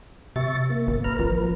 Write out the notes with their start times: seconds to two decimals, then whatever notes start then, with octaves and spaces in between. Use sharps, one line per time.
0.36 C3 E5 C#6 A6
0.70 A#3
0.87 G#1
1.04 B4 A#5 F6
1.19 A1 F3 A#4 B4